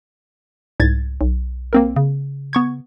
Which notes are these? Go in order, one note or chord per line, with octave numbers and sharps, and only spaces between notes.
C2 G#2 G#6 A6
B1
A#3 C4 A#4
C#3
B3 C#6 G#6